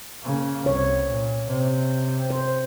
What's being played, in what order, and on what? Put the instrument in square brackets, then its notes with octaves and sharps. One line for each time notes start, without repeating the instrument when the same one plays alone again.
[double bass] C#3 A#3
[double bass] C2 [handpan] C#5
[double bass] A#2
C3
[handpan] C5